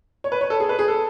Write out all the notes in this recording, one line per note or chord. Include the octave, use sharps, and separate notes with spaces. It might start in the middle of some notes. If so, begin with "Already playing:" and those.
C#5
B4
C#5
A4
G#4
B4
G#4
A4